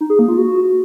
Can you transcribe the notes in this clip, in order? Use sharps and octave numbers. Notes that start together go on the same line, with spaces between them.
D#4
G#4
A#3
F4
F#4